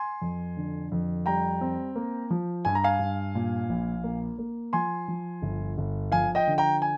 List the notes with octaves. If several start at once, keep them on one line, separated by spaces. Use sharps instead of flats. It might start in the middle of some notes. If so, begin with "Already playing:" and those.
Already playing: G#5 C6
F2
D3
F2
G3 G5 A#5
C4
A#3
F3
G2 G#5
A#5
F5 G#5
G2
A#2
A#1
A#3
A#3
F3 G#5 C6
F3
G1
G1
F3 F5 G#5
D#5 G5
D3
G5 A#5
G#5